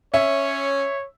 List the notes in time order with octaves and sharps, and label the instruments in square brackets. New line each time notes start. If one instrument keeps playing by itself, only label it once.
[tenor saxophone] C#4 [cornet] C#5 [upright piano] E5